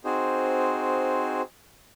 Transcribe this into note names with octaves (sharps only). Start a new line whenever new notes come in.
C4 D#4 F#4 G#4 C5